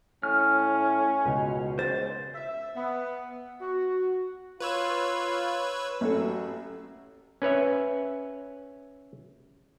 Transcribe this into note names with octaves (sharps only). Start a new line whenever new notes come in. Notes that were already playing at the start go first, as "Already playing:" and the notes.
A2 C#4 F6
C#2 B2
C#2 C5 A6
E5
B3
F#4
F4 B4 C#5 E6
A1 F#3 A4
C#4 B4 C#5 E5